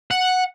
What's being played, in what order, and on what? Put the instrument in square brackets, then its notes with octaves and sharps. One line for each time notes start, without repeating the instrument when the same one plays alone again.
[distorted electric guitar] F#5